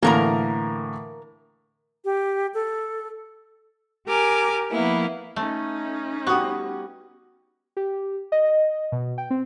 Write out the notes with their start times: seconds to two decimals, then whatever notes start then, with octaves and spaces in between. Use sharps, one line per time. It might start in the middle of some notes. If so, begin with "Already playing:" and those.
0.03 A2 D3 E3 A#3 A#4 A#5
2.05 G4
2.54 A4
4.08 G4 A#4 G#5 D6
4.71 F3 A#3 B3 E4
5.36 A3 C#4 D#4
6.27 G3 B3 F#4 C#6 D#6
7.77 G4
8.32 D#5
8.92 B2
9.18 G5
9.30 C4